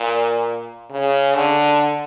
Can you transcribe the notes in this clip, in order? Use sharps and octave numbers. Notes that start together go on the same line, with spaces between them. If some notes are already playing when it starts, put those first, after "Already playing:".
Already playing: A#2
C#3
D3